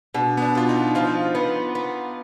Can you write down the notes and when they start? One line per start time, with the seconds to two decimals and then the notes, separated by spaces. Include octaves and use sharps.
0.15 B2 D4
0.37 B3
0.42 D4
0.55 B2 F4
0.69 D#4
0.95 F3 F4
1.35 B3
1.75 B3